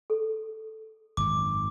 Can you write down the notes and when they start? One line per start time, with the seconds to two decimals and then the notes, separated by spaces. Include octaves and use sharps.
0.10 A4
1.17 G#1 F#2 D6